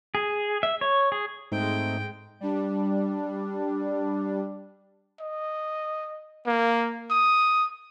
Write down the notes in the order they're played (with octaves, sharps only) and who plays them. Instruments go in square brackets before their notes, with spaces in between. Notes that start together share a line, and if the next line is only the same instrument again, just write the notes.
[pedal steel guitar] G#4
E5
C#5
G#4
[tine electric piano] G#2 [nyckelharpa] G#3 G5 [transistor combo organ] A3 C4 D#4
[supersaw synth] G3 D4
[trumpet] D#5
A#3
D#6